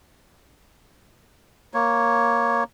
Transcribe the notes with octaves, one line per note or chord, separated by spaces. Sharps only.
A#3 C#5